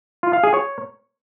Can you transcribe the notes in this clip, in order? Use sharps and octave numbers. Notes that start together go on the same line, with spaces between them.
F4
F5
G#4
C#5